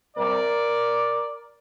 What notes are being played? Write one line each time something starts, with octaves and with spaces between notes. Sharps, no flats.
C3 G3 A#4 D5